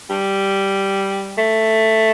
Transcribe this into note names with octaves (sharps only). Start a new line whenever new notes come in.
G3
A3